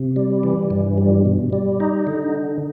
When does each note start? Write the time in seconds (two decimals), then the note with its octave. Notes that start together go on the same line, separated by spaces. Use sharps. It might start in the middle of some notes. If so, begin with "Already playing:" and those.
Already playing: C3
0.16 G3
0.43 E3
0.70 G2
0.98 G3
1.25 B2
1.53 G3
1.80 D#4
2.07 D3